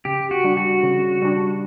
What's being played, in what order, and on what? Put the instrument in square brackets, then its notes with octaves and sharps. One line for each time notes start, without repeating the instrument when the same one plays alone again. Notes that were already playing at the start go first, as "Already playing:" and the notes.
[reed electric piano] C#3 [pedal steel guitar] G4
[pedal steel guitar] F#4
[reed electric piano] G3 D4
[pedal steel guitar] F#4
[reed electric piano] C#3
G3 D4